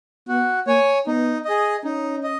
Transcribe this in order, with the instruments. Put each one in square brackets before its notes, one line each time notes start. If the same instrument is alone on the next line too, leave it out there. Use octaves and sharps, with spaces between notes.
[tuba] B3 [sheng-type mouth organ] F#4
[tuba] A#3 [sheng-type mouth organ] C#5 G#5
[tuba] B3 [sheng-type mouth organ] D#4
[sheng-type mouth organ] G#4 D#5
[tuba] C#4 [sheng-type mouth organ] D#4
[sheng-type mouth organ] D#5